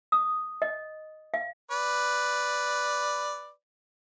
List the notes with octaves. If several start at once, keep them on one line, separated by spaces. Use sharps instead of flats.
D#6
D#5
F5
B4 D5